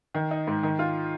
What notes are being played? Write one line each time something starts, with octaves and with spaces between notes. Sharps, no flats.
D#3
D#4
G#2
D#3
F4